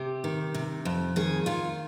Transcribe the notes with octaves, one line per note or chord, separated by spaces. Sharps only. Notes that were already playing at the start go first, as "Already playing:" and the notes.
Already playing: C3 G4
D#3
C3
F2
D#3 G#4
D#3 F4